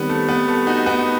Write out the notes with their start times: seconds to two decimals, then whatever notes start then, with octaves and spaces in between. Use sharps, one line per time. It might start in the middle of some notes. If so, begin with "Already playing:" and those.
Already playing: D#3 G3 B3 C4
0.09 A3
0.29 B3
0.48 A3
0.67 D#4 F#4
0.86 B3 D#4